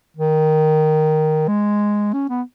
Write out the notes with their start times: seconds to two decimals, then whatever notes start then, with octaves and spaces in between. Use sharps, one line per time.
0.17 D#3
1.48 G#3
2.13 C#4
2.29 B3